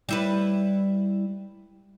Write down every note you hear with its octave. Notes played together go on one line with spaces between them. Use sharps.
G3 E4 B4